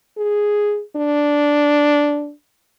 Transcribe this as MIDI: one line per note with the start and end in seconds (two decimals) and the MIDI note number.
0.17 0.81 68
0.96 2.31 62